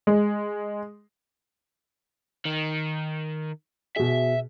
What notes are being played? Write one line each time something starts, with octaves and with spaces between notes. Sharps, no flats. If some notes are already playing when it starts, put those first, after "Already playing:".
G#3
D#3
B2 G#4 E5